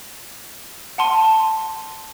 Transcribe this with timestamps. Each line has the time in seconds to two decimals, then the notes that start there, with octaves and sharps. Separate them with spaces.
0.98 F#5 A5 C6 D#7